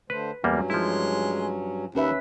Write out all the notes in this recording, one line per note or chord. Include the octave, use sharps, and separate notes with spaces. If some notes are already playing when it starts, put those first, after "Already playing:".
D3 A3 B4 C5
E2 G2 F#3 G3 A#3 C#4
F3 G#3 E4
D#2 C#4 B4 E5